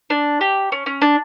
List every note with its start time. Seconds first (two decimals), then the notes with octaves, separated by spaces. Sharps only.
0.10 D4
0.41 G4
0.72 C#4
0.86 C#4
1.02 D4